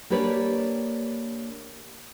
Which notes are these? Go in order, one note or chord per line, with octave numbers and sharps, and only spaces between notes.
A#3 D4 G4 B4 C#5 D5